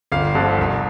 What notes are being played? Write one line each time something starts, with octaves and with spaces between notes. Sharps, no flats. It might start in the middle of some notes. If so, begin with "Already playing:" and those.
G1 F5
G2 D3 F3
C2